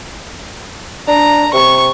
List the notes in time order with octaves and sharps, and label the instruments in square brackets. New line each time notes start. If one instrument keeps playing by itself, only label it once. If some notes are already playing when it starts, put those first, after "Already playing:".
[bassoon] D4 [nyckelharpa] A#5
[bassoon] C3 [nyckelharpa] C#6